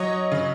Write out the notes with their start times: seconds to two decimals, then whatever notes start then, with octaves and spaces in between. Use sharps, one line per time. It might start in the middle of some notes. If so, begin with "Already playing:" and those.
Already playing: F#3 C#5 D#5
0.32 C#3